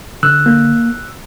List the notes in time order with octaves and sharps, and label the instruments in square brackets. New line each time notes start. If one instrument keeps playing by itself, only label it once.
[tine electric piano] D3 E6 F#6
A#3